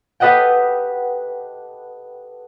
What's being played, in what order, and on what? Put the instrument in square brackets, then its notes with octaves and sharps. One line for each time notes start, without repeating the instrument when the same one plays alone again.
[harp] G4 A4 B4 D#5 F#5 G5